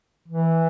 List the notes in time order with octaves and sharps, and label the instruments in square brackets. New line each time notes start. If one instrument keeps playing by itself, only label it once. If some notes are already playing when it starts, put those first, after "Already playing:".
[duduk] E3